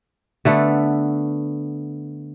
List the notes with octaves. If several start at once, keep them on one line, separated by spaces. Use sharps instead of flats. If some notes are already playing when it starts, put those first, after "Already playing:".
D3 A3 B3